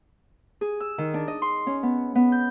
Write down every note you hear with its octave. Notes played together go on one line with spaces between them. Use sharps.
G#4
E6
D#3
D4
D#5
C6
C#4
B3
B3
G6